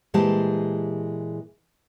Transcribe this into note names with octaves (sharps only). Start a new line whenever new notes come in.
A#2 E3 G#3 G4 C5 A5